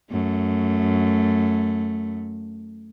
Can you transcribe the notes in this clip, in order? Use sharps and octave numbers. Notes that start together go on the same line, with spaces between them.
F#2 A3